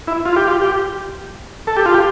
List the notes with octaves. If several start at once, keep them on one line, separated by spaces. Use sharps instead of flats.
E4
F4
G4
F4
G4
A4
G4
F4
G4